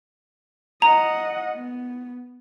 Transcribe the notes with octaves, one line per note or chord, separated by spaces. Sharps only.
D#5 F#5 A#5
B3